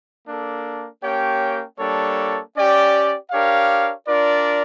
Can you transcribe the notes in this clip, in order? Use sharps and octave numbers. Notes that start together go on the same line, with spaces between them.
A#3 D4 A4
A#3 C#4 G4 C#5 G5
G3 A#3 D4 A4 C#5
C#4 G4 D5 G5
D4 G4 A#4 C#5 F5
D4 F4 A#4 D5